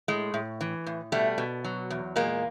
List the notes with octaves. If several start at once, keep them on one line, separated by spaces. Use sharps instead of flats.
A2 G#3
A2
E3
A2
B2 G3 A3
B2
F#3
E2
A#2 G#3 A#3